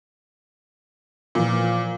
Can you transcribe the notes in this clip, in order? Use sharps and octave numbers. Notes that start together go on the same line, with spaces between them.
A#2 E3 F3 F5